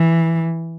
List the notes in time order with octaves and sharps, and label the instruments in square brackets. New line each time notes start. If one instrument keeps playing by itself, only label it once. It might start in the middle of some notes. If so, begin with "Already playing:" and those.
Already playing: [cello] E3